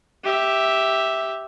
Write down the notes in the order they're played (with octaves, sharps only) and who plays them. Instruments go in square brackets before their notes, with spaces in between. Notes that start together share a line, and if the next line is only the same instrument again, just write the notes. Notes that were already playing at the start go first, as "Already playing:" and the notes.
[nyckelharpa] G4 E5